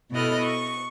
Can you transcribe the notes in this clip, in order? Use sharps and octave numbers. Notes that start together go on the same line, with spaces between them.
B2 E4 A4 D#5 F6 F#6
C#6